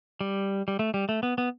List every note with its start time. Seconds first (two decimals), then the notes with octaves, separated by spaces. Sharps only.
0.21 G3
0.68 G3
0.79 A3
0.94 G3
1.09 A3
1.23 B3
1.38 B3